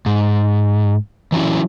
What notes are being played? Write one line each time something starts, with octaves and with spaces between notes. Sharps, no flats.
G#2
E3 F#3 C#4 E4